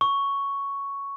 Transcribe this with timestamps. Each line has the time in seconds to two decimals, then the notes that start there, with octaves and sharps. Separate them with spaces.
0.01 C#6